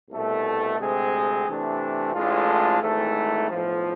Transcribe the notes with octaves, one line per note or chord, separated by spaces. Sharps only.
C2 B2 A3
D2 C3 G#3 C4 G#4
C3 E3 A3 D4
A1 A2 G#3 D4 F4
G#1 G#2 E3 A3
B1 A2 F3